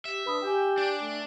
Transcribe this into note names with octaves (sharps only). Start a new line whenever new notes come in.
G4 E5
D4 B4 B5 D#6
G4 G5 G#5
D4
A3